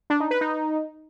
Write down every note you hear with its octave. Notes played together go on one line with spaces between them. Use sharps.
D4
D#4
B4
D#4